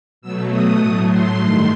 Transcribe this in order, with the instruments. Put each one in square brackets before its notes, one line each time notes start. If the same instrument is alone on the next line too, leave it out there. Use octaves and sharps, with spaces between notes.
[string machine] B2 F#3 A3 E6
D#6
A2 F#3 A3 D#6
C6
G2 D#3 A3